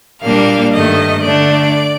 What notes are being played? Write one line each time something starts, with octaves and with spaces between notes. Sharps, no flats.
A#2 G3 A#3 D4 F5
G2 D#3 A3 D#5
D3 A3 D4 D5